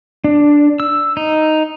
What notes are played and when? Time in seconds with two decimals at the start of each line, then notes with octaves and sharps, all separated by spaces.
0.24 D4
0.80 E6
1.17 D#4